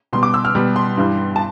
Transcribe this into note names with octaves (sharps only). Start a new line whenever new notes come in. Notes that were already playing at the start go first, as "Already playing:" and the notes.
B2 G3 C6
D6
E6
F6
B2 G3
C6
G2 E3 G3
A5